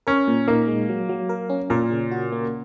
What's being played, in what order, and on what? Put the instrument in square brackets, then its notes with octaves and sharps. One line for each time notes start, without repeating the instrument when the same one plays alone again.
[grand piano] C#4 [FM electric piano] A#4
[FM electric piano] A#2
[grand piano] A#3 [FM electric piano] D#4
[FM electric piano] G#3
F#3
F#3
A#4
C#4
[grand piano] A#2 [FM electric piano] A#4
[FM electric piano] C#3
F#4
A#3